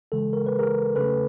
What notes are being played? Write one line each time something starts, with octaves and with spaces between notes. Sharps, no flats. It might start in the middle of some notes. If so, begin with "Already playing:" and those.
C#3 E3 G#3 A4
A#4
B4
G#4 A#4
C#3 F#3 A3 C#4 A4 B4